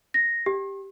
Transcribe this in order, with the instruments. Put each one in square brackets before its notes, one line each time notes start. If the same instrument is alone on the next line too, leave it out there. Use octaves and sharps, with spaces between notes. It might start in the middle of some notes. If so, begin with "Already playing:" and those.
[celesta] A#6
G4